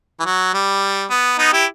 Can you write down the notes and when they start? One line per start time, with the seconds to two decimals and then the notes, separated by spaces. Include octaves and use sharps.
0.20 E3
0.25 F#3
0.54 G3
1.10 B3
1.38 B3 D#4
1.52 E4 G4